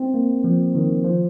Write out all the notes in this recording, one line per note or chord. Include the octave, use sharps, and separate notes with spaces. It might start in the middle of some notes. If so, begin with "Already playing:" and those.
Already playing: C4
A#3
F3
D#3
F3